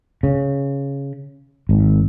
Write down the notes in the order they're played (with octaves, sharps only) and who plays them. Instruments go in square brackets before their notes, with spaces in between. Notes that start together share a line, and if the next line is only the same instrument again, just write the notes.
[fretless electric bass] C#3
G#1